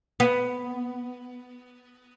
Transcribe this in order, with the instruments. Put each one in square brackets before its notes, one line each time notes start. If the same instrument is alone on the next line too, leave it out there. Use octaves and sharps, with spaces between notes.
[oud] B3